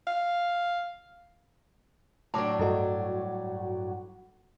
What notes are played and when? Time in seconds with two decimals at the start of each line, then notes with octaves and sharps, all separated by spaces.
0.07 F5
2.34 A2 F#3 D4 A5 D6
2.59 G2 E4 F#4 A4 D#5